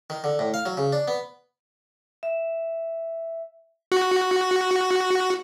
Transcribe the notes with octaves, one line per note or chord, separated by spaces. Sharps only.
D#3
D3
A2
F5
F#3
C#3
D4
B3
E5
F#4